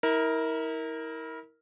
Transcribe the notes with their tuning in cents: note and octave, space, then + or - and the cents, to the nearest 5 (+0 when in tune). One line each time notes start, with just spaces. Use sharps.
E4 -35 A#4 +0